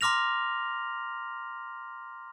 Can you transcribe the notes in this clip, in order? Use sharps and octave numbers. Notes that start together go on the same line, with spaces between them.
A#5 C6 D6 F6 A#6 F7